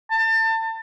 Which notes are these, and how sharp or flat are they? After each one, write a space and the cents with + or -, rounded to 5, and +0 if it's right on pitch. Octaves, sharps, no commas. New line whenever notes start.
A5 +30